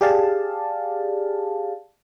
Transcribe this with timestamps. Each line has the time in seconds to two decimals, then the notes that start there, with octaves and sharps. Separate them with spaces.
0.01 G4 G#4 D5 F5 A5